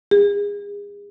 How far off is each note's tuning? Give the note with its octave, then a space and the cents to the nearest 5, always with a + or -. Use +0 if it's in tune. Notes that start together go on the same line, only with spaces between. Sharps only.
G#4 -35